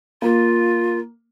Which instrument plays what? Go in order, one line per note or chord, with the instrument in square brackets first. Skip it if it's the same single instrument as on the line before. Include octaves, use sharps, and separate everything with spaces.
[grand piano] A#3 [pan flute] F4